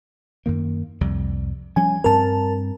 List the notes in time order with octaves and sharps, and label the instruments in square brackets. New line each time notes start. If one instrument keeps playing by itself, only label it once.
[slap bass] F#2 D#3 A#3
C2 F2 G3
[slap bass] F3 G3 C#4 [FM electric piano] G#5
[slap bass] G2 C4 [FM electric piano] A#4 A5